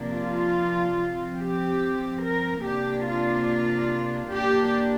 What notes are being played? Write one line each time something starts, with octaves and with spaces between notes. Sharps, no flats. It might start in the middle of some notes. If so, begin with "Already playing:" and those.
Already playing: C3 F3 A#3 D4
F4
F3 C4
G4
A#4
C3 A#3 D4 G4
F4
A#2 A#3 D4 G4